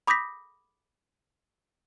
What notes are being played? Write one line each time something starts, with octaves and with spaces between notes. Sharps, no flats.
B5 D6 D#6 G6 A#6 B6